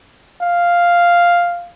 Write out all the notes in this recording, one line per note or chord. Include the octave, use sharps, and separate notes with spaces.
F5